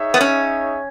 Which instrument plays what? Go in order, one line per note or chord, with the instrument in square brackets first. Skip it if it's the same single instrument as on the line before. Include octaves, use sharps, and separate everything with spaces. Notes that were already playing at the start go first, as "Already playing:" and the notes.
Already playing: [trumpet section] D#4 G#4 C#5 E5
[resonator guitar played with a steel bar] B3
C#4